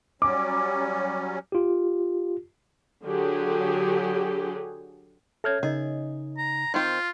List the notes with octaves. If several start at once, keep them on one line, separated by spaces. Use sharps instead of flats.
F#3 G3 C#4 D6
F4 G4
D3 F#3 G4 G#4
C#4 A4 C#5 E5 F6 G#6
C#3 D#4 G#4 A#4 D#5
A#5
D#3 C4 F4 C5 G5 C6